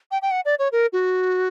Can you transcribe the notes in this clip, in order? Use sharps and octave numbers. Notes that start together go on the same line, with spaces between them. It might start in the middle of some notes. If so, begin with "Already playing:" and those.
G5
G5
F#5
D5
C#5
A#4
F#4